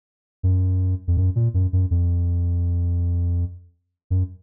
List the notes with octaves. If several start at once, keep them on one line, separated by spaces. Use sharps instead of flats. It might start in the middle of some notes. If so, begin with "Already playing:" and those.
F#2
F2
F#2
A#2
F#2
F#2
F2
F#2